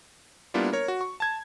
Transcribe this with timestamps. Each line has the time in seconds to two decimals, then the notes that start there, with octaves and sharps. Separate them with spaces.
0.54 G3 A#3 B3 D4 E4 F4
0.73 A#4 C#5
0.88 F#4
1.01 C#6
1.20 A5 G#6